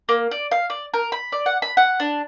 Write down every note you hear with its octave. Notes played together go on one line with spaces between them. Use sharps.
A#3
D5
F5
D5
A#4
B5
D5
F#5
B5
F#5
D4